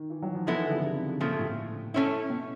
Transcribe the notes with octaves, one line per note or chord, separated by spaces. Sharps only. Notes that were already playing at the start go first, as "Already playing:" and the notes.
Already playing: D#3
E3
F#3
F3
F3 G#3 B3 E4 A4
D#3
D3
C#3
C3
C3
C3
A#2 C#3 F3 A3
A2
A3 C#4 E4
B2